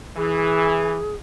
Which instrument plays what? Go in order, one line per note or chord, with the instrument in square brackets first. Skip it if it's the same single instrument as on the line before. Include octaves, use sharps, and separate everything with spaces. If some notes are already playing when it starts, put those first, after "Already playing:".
[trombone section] E3 [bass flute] G#4